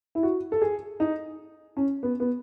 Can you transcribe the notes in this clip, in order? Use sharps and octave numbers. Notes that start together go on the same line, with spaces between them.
E4
F#4
A4
G#4
D#4
C#4
B3
B3